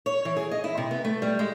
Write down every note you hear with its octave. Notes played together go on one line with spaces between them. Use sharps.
C#5
E3
G#4
D#5
E4
C3
B3
A3
G3
G#3